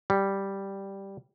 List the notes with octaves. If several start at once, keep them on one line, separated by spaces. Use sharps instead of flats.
G3